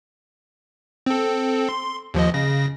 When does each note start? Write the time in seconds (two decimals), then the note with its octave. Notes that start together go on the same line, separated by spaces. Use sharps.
1.06 C4 A4
1.69 C6
2.14 D#2 F3 D#5
2.34 C#3 A#6